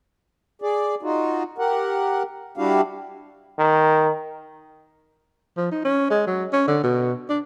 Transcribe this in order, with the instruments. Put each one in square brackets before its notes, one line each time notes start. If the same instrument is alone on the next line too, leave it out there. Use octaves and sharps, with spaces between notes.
[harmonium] G#4 D5
D#4 F4 F#4
G4 A#4 F#5
G3 D4 E4 F#4 G4 F5
[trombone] D#3
[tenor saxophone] F3
D#4
C#4
G#3
F#3
C#4
D3
B2
D4